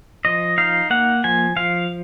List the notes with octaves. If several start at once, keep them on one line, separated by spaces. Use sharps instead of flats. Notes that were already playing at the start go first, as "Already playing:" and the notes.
F3 D#5
D#4 F5
A#3 F#5
F3 G#5
F3 F5